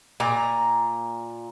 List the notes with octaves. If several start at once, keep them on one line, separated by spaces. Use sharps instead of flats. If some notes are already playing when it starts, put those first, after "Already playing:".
A#2 A#5